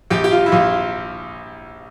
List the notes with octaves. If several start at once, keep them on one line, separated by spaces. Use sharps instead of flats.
A#1 G4
G4
F4
E4
A#1 F4